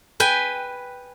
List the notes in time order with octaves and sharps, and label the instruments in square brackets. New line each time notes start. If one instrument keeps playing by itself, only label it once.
[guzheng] B4 G5 G#5